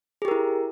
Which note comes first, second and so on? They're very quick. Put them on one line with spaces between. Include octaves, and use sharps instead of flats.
G#4 G4 A#4 E4